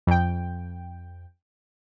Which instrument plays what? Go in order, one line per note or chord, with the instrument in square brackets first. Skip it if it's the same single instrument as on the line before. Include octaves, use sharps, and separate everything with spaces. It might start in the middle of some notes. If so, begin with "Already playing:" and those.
[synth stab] F2 G5